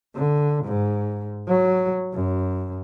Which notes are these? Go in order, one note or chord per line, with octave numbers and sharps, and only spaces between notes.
D3
G#2
F#3
F#2